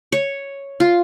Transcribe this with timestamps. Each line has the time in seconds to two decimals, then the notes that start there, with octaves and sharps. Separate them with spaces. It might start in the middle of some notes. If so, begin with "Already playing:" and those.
0.12 C#5
0.80 F4